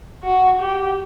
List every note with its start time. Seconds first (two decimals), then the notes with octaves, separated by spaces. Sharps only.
0.23 F#4
0.60 G4